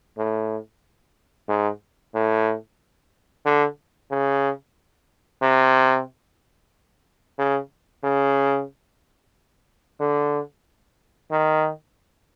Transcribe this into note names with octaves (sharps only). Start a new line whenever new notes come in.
A2
G#2
A2
D3
C#3
C3
C#3
C#3
D3
D#3